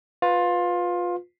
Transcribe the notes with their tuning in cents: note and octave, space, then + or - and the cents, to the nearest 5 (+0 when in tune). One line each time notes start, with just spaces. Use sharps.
F4 +20 B4 +10